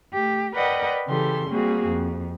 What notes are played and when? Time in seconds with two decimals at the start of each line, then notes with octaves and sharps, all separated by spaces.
0.13 A3 G4
0.54 A#4 B4 D5 D#5 F#5 G5
1.07 C#3 E3 G4 A4 C6
1.49 G3 A#3 C4 F#4 G#4
1.87 F2